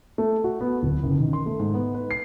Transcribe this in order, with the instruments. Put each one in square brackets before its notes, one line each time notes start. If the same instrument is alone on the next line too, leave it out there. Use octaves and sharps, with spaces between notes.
[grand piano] A3
F#4
B3
D1
F#1
D#3
C6
A3
G#2
B3
B4
C7